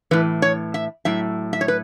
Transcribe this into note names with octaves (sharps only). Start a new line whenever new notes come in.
A2 E3 B4
C#5
E5
A2 F#3 E5
E5
C#5
B4